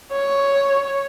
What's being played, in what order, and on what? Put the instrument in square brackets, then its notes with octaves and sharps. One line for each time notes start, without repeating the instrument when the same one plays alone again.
[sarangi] C#5